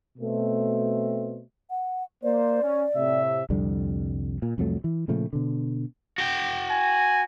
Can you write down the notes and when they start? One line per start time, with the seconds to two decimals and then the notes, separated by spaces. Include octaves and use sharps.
0.18 B2 A3 C4
1.70 F#5
2.23 A#3 C5 D5
2.63 C#4
2.95 A2 C3 E5
3.50 C2 F2 D3 G3
4.42 A#2
4.58 C2 F2 F#3 A3
4.84 E3
5.08 A#2 C#3 F3 A3
5.33 B2 D3
6.18 F#4 G5
6.71 G#5